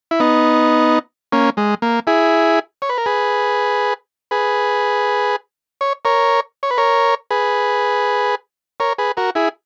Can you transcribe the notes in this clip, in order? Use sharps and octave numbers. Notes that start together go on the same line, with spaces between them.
E4
B3 D#4
A#3 C#4
G#3
A#3
E4 G#4
C#5
B4
A#4
G#4 B4
G#4 B4
C#5
A#4 C#5
C#5
B4
A#4 C#5
G#4 B4
A#4 C#5
G#4 B4
F#4 A#4
E4 G#4